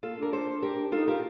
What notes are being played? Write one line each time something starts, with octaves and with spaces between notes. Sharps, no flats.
A#3 F4 A4
D4 A#4
A4 C5
G4 A#4
D#4 F4 A4
F4 G4 A#4